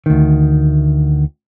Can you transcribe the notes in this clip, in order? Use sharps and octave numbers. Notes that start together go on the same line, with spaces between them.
D2 D#3